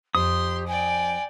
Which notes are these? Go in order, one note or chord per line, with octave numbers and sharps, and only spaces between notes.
F2 G4 C6 D#6
D5 G5 G#5